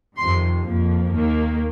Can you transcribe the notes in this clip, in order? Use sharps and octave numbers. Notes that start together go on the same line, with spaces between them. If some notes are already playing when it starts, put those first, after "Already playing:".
F2 C3 D#3 C6
F2 F3 A#3
D#2 D#3 A#3